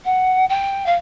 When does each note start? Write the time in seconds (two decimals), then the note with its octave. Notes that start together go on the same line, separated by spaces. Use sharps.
0.05 F#5
0.49 G5
0.86 F5